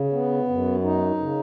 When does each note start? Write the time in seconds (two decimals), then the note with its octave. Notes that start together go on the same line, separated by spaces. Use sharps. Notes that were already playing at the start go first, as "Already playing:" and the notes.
Already playing: C#3
0.13 B3
0.48 F#2
0.84 D#4
1.20 C#3